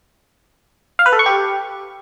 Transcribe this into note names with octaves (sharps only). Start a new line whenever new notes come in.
F5
B4
A4
C#6
G4